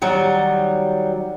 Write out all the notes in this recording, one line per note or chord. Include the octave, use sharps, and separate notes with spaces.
D#3 F#3 G3